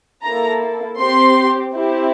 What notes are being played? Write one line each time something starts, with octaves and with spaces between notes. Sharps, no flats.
A#3 E4 A4 A#5
C4 G4 C6
C4 E4 G4